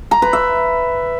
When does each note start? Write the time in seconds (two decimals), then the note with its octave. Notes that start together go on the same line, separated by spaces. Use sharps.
0.11 A#5
0.22 B4
0.33 E5